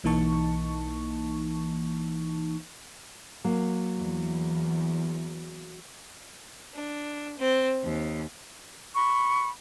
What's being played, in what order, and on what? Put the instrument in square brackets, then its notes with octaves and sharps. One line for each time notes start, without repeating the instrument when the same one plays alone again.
[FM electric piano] B1 E3 A#3 D#4 A5 C#6
[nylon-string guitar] F#3 A#3
[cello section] E2
[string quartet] D4
C4
D#2
[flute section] B5 C#6